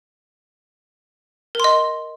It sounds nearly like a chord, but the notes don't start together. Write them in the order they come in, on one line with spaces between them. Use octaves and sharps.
A#4 C6 D#5